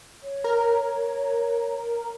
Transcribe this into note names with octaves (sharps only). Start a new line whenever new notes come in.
C#5
A#4